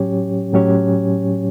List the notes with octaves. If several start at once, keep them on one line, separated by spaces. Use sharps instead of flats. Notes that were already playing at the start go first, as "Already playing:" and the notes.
Already playing: A2 F#3 C#4 G4 C#5
A2 F#3 C#4 G4 C#5